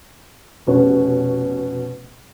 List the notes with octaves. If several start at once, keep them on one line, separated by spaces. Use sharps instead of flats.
F1 B2 C#4